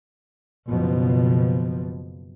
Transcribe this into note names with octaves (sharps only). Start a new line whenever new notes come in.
F#1 B2 F3